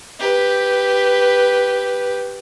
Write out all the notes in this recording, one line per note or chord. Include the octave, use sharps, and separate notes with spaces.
G4 B4